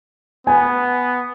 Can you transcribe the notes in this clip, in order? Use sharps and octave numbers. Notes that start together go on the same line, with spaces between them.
B3 G#5